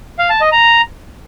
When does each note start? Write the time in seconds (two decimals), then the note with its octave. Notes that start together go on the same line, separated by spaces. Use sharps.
0.19 F5
0.30 A5
0.41 D#5
0.52 A#5